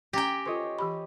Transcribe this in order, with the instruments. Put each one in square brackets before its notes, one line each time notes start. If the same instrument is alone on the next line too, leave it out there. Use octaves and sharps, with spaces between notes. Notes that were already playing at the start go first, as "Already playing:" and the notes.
[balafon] C#4 A#5 [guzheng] G4 G5 [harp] G#5 A6 A#6
[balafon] F4 A4 [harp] C5 C#5 D#5
[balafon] E3 G4 B5